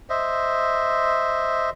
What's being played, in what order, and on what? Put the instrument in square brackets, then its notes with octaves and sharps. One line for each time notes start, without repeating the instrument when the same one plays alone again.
[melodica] C5 D#5 E5